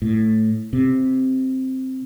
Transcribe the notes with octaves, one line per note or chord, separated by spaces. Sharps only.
A2
C3